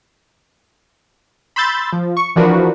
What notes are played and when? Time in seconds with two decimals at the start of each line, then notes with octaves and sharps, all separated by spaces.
1.56 B5 C6 E6 G6 A6
1.93 F3
2.17 C#6
2.36 E3 F3 D4 F#4 A#4 B4